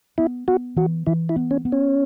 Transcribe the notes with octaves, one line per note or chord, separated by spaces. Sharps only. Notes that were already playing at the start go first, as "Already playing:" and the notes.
B3 E4
B3 F#4
E3 F#4
E3 E4
E4
B3
C#4
B3
C#4